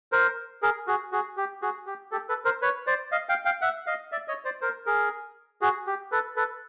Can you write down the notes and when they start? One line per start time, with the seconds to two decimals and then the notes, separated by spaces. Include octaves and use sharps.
0.12 A#4 C5
0.62 G#4 A#4
0.87 F#4 G#4
1.12 F#4 G#4
1.37 G4
1.62 F#4 G#4
1.87 G4
2.11 G4 A4
2.29 A4 B4
2.45 A#4 C5
2.62 B4 C#5
2.87 C5 D5
3.12 D#5 F5
3.29 F5 G5
3.45 F5 G5
3.61 E5 F#5
3.86 D#5 F5
4.12 D5 E5
4.28 C#5 D#5
4.45 C5 D5
4.61 A#4 C5
4.86 G#4 A#4
5.61 F#4 G#4
5.87 G4
6.12 A4 B4
6.36 A4 B4